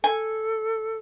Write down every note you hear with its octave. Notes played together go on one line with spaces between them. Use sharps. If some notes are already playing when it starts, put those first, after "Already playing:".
A4 G#5